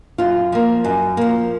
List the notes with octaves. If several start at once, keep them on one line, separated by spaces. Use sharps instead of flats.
F#2 F4
F3 A#3
F#2
F3 A#3